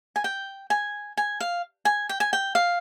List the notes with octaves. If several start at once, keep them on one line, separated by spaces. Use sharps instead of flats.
G#5
G5
G#5
G#5
F5
G#5
G5
G#5
G5
F5